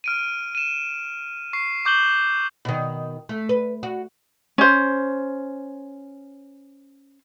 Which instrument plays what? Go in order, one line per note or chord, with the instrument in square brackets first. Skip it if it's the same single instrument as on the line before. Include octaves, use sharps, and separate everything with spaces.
[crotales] F6 D7 D#7
D#7 E7
C#6 C7
C#6 D6 G6 E7 F#7 G7
[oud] B2 D#3
A3
B4
F#4
[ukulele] C#4 C5